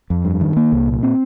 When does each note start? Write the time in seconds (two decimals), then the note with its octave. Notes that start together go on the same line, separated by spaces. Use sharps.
0.10 F2
0.25 G2
0.41 D#3
0.57 A#3
0.72 C2
0.88 A#2
1.03 C4